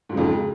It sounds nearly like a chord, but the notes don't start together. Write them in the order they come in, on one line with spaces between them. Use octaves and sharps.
G#2 F#3 C#3 F2 G#3